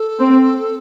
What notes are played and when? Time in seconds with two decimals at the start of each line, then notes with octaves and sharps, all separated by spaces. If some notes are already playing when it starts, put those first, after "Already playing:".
Already playing: A4
0.20 C4